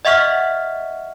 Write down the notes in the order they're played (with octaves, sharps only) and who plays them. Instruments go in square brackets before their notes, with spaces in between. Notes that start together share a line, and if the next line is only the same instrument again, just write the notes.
[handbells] D#5 E5 F#5 C#6 F6 B6